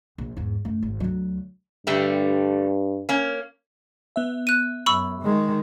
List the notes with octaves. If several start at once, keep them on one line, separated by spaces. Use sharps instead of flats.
A#1
E2 G#2
F#2 A3
G#1
D2 F#3
G2 D3 G3 A3
A#3 C#4
B3 E5
F#6 D#7
F#2 B5 C#6 E6
D#3 G#3